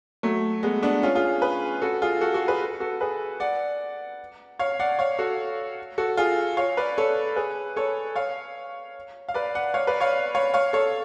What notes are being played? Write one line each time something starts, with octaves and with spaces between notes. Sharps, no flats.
F#3 A3
G#3 B3
B3 D4
C#4 F4
F4 G#4
G#4 B4
F#4 A4
F4 G#4
F#4 A4
F#4 A4
G#4 B4
F#4 A4
G#4 B4
D5 F#5
C#5 F5
D5 F#5
C#5 F5
F#4 A4
F#4 A4
F4 G#4
C#5 F5
B4 D5
A4 C#5
G#4 B4
A4 C#5
C#5 F5
F5
B4 D5
D5 F#5
C#5 F5
B4 D5
C#5 F5
C#5 F5
C#5 F5
A4 C#5